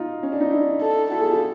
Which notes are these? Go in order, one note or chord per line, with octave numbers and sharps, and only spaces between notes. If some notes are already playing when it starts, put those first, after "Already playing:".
Already playing: D#4 F4
C#4
D4
D#4
D4 E4
A4
E4 F#4 A4
F#4 G#4
F4 G4